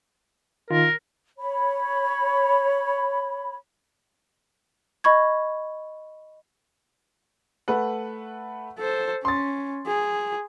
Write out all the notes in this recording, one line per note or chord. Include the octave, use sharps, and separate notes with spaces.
D#3 F4 A#4
C#5 B5
D#5 B5 C#6 G#6
A3 B4 F#5
A4 C5
C#4 C6 A6
G#4